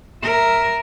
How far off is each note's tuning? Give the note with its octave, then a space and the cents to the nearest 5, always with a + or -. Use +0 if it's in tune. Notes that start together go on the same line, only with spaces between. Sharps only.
A#4 +0 E5 +0